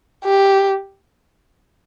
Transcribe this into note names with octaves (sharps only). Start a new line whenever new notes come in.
G4